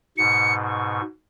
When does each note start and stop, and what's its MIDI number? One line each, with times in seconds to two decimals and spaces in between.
0.18 1.01 44
0.18 1.01 47
0.18 0.54 97
0.65 1.04 85